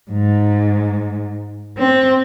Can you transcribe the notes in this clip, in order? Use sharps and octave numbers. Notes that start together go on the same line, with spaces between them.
G#2
C4